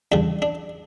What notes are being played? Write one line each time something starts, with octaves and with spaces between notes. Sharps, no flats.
E2 C#3 G3 D4
D4